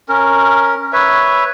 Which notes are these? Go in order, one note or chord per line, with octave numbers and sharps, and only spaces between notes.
C#4 A#4
B4 C#5 E5